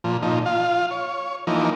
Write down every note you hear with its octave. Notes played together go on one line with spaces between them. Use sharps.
A#2 F3
A#2 F3 D#4
F4 F5
C#5
E3 F3 A#3 D#4